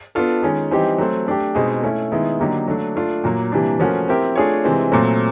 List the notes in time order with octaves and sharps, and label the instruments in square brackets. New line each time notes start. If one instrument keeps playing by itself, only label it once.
[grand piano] B3 D4 F4 A4
D#3 G#3 C#4
E3 G3 C4 D#4 G4
F#3 A3 C4
A3 D4 G4
B2 G#3 C4 D#4 G#4
A3 C#4 E4
D#3 G#3 B3 E4
D3 F#3 A#3 D#4 G4
F#3 A3 D4
A3 D4 F4
A#2 F#3 A#3
C3 E3 G3 A#3 D4
F3 A3 C#4 F#4 A#4
C4 E4 G4 A#4
A3 D4 F4 G#4 C#5
C3 E3 G#3 C4
A#2 F#3 A3 C4